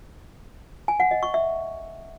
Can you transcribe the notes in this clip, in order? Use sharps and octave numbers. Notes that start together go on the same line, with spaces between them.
G#5
F#5
D#5
C#6
E5